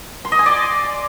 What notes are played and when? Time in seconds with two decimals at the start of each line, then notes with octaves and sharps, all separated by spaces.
0.25 C6
0.32 D#5
0.39 G#5
0.46 D5